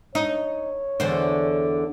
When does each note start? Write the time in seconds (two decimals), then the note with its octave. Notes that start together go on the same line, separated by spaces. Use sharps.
0.15 D#4 C#5
1.00 E2 D3 C5